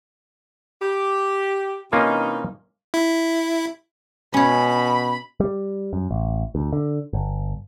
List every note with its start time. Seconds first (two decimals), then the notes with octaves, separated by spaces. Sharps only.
0.82 G4
1.93 C3 E3 A#3 C#4 D#4 F4
2.94 E4
4.34 B2 C#4 C#5 B5
5.40 G3
5.93 F#2
6.11 A1
6.55 D2
6.73 D3
7.13 G1